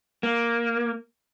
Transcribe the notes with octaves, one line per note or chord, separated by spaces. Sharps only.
A#3